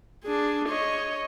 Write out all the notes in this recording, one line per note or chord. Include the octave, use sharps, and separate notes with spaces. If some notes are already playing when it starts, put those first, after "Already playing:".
D4 G#4
C#5 D#5